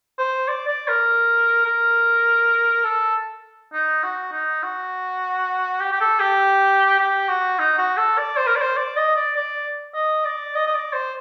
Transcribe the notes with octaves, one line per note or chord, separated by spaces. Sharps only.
C5
D5
D5
A#4
A#4
A4
D#4
F#4
D#4
F#4
G4
G4
A4
G4
G4
F#4
D#4
F#4
A4
D5
C5
A#4
D5
C5
D5
D#5
D5
D5
D#5
D5
D#5
D#5
D5
C5